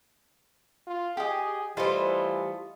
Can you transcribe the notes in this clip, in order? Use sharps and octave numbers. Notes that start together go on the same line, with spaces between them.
F4
G4 G#4 D#5
E3 G3 A3 F4 C5 D#5